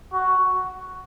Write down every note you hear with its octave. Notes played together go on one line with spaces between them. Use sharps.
F#4